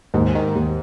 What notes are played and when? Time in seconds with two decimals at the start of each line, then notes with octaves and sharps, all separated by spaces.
0.14 D#2 G#2
0.35 D#3
0.56 D#2